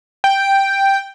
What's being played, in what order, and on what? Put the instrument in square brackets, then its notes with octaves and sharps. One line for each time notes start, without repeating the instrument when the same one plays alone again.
[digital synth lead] G5